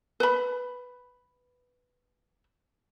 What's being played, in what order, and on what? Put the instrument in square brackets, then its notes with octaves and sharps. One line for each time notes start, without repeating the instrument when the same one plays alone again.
[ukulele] B4 B5